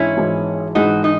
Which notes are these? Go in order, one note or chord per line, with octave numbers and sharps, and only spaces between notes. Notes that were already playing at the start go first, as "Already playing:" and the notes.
Already playing: G#1 G#2 E3 C#4 E4
G#1 G#2 E3
G#1 G#2 E3 D#4 F#4
D#4